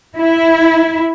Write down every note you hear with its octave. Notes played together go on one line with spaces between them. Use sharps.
E4